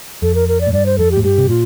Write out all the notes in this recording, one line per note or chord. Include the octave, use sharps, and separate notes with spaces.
F2 A4
A#4
A#4
D5
A2
G2 D5
C5
F2 A4
G4
A2
G2 G4
C3
A#2 F4